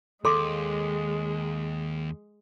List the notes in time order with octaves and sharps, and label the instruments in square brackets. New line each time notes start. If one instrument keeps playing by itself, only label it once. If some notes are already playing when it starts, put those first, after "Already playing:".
[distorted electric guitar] D#2 [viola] G#3 [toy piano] A4 C6 D6